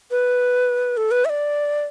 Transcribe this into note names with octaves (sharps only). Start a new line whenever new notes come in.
B4
A4
B4
E5
D5